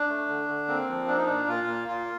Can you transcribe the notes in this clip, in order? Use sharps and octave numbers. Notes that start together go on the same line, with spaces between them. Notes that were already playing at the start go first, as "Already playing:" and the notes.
Already playing: D4
A3
D3
D3
A#3 C4
F3
A#3 D4
D#4
A#2 D4
A#2 F4
A#3
A#2 F4